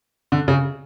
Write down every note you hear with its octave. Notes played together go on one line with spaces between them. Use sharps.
D3
C#3